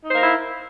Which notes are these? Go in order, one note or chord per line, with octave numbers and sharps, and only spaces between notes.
A#3 D#4 E4 A#4 C5